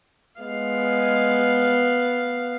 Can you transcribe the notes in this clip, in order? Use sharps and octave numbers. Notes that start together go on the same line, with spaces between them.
G#3 B3 F5